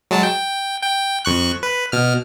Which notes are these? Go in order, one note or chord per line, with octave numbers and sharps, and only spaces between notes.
F#3 G#3 A5
G5
G5
F2 C#6 F#6
B4
B2 F6